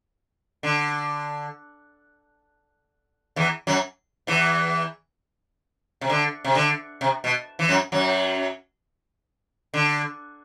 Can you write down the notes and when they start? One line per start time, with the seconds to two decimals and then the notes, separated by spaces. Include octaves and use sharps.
0.63 D3
3.36 E2 E3
3.67 F#2 F#3
4.27 E2 E3
6.01 C3
6.10 D3
6.44 C3
6.55 D3
7.01 C3
7.24 B2
7.59 E3
7.69 F#2 F#3
7.92 F#2 F#3
9.74 D3